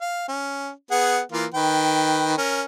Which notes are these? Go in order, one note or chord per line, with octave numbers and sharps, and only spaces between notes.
F5
C#4
B3 G#4 F#5
E3 A#3 F4
D#3 B4 G5
C#4 A#4